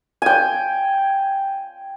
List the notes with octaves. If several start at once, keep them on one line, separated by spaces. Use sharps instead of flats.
G5 G#5